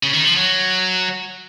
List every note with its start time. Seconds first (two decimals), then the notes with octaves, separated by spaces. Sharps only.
0.03 C#3
0.13 D#3
0.25 F3
0.36 F#3